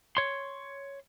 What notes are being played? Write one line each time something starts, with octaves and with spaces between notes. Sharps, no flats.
C#5 C6